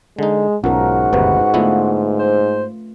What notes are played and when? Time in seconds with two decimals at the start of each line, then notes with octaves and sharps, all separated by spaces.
0.19 D3 G#3 D#4
0.64 B1 G#2 C#4 F4 F#4 A#4
1.13 G1 D#2 C3 B4
1.54 D3 A3 B3 E4 F4
2.19 C5